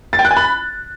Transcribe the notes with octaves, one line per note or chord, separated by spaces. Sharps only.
A6
G5
F#6
G#5
B5